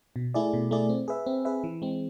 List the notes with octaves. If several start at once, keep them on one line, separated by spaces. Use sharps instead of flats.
B2
A3 E4 G#4 D5
B2
A3 E4 G#4 D5
C4
G#4 B4 E5
C4
G#4 B4 E5
E3
G#3 C4